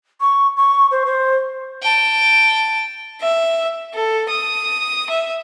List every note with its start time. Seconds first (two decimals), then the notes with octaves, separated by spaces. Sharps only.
0.21 C#6
0.57 C#6
0.91 C5
1.06 C5
1.82 G5 A5
3.20 E5
3.94 A4
4.28 D#6
5.09 E5